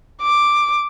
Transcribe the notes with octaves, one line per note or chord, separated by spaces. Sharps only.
D6